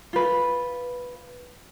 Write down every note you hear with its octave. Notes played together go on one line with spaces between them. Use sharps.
F4 B4